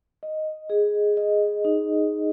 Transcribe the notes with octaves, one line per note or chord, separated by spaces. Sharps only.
D#5
G#4
D#5
D#4